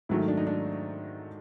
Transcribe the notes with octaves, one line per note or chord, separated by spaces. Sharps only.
G#2 D#3 F#3 A3 E4
D#4
D4
D#4
D4